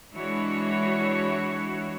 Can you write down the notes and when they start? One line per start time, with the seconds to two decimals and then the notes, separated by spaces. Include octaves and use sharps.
0.13 E3 G#3 D4 E4 F#4 C#5